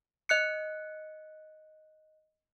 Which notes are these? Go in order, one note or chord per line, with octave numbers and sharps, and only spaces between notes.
D#5 F#6 C#7